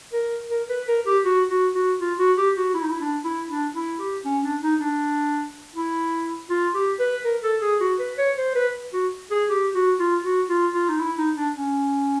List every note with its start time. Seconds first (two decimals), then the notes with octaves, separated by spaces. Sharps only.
0.13 A#4
0.50 A#4
0.69 B4
0.88 A#4
1.06 G4
1.25 F#4
1.50 F#4
1.75 F#4
2.00 F4
2.19 F#4
2.37 G4
2.57 F#4
2.75 E4
2.83 D#4
2.90 E4
3.01 D4
3.24 E4
3.49 D4
3.75 E4
3.99 G4
4.25 C#4
4.43 D4
4.62 D#4
4.81 D4
5.75 E4
6.50 F4
6.74 G4
7.00 B4
7.25 A#4
7.43 A4
7.62 G#4
7.81 F#4
7.99 B4
8.18 C#5
8.37 C5
8.55 B4
8.93 F#4
9.31 G#4
9.50 G4
9.75 F#4
9.99 F4
10.24 F#4
10.49 F4
10.74 F4
10.89 D#4
10.99 E4
11.18 D#4
11.36 D4
11.55 C#4